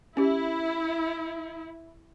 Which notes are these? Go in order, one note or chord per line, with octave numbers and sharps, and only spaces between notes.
C#4 E4 G4